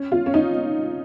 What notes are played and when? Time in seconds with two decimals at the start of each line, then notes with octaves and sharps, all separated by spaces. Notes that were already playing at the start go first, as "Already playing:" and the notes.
Already playing: C#4
0.12 F4
0.26 C#4
0.34 D#4